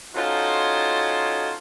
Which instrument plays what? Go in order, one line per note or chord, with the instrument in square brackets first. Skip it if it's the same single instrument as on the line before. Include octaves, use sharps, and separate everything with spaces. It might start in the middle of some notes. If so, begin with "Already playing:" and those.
[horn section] C#4 D#4 F4 F#4 A4 C5